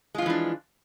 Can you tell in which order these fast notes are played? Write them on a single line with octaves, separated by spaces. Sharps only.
G#3 F4 F3 E3 D4